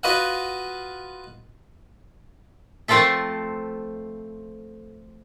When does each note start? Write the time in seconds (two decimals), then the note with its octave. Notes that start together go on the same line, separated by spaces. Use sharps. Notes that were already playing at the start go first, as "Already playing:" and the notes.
0.03 F4 F#4 B4 D#5 F5 F#5
2.88 F3 A3 C4 F4 A4 E5